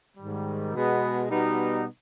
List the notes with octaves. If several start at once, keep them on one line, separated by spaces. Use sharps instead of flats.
G#2 D#3 G3
B2 G#3 B3
B2 G3 B3 D#4